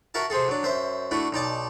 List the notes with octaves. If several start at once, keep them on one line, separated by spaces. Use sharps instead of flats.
F#4 A#4 E5 A5
C3 C4 G#4 A4
F#3 D4
F#2 C5 E5
A3 D4 E4 F#4
B1 D#4 D5 A5